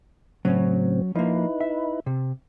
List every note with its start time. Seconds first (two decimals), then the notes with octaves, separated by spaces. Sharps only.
0.45 A2 C#3 F#3 C4 C#4
1.15 F3 A#3 D#4 E4 B4
1.61 E5
2.06 C3